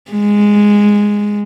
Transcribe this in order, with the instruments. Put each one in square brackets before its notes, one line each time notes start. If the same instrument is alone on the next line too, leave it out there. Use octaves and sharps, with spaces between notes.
[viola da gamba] G#3